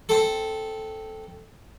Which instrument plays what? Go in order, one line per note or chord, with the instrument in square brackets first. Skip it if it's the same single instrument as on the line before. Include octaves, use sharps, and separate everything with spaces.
[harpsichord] C4 A4